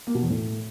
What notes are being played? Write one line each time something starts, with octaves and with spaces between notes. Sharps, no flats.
A#3
B2
E2
A2